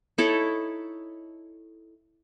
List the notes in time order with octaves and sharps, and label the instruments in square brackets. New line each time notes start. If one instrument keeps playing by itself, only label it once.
[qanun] D#4 E4 A4 C#5